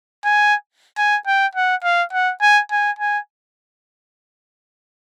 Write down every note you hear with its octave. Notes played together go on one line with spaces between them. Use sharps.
G#5
G#5
G5
F#5
F5
F#5
G#5
G#5
G#5